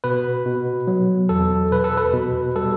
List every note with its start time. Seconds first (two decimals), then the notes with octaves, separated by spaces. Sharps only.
0.04 B2 B4
0.46 B2
0.87 F#3
1.29 E2 A4
1.71 B2 B4
1.84 A4
1.97 B4
2.13 B2
2.56 G3 A4